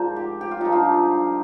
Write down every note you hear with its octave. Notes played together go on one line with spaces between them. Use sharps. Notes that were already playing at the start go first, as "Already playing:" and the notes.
Already playing: G#2 F3 A#4 C5 D5
G4
G4
F4
G2 D3 F3 D#4
F4